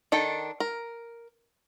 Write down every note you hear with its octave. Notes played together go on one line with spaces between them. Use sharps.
D#3 D4 A4 G5
A#4